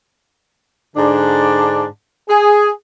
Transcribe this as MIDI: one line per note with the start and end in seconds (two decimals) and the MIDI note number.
0.96 1.85 44
0.96 1.85 50
0.96 1.85 62
2.29 2.70 68